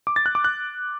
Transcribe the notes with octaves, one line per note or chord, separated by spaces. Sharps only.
D6
A6
F#6
D6
F#6